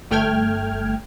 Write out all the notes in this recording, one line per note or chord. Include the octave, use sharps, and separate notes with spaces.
G1 A3 G5 F6 G#6